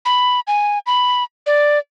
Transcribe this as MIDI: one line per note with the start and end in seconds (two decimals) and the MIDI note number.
0.05 0.40 83
0.47 0.79 80
0.86 1.24 83
1.46 1.79 74